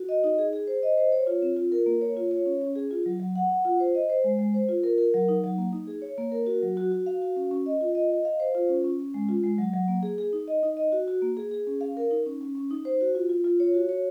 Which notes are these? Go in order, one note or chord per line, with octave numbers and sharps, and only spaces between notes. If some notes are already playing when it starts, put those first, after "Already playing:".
Already playing: F#4
D#5
D#4
G#4
G#4
C5
D#5
C5
C#5
F4
C4
F4
A#4
A#3
C#5
F4
C#5
C#4
C#4
G#4
F4
F#3
F#3
F#5
F#5
F4
C5
D#5
C5
G#3
G#3
C5
F4
A#4
A#4
F#3
D#4
F#3
A#3
D#4
G#4
C#5
A#3
A#4
F#4
F#3
F#4
F#4
F5
F#4
C#4
C#4
D#5
F4
D#5
D#5
F5
C5
F4
C#4
C#4
C#4
G#3
F4
G#3
F#3
F#3
A#3
G#4
G#4
D#4
D#5
D#4
D#5
F#4
F#4
A#3
G#4
G#4
C#4
F5
A#4
D#4
C#4
C#4
C#4
D#4
C5
F#4
F4
F4
F4
C#5
F#4
C#5